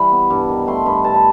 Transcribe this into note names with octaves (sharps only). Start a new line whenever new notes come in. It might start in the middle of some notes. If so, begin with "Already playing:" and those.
Already playing: E3 G3 B5
B3
G2
D#3
A3 C6
G2 B5
G2 A5
B5